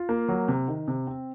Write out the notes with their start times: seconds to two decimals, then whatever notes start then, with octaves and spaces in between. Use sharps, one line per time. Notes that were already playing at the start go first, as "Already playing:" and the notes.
Already playing: F4
0.09 A#3
0.28 F#3
0.48 C3
0.68 D#3
0.88 C3
1.07 C4